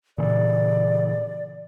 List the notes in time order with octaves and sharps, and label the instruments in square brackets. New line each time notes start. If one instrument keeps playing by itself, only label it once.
[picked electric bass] A#2 C#3 E3 [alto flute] D5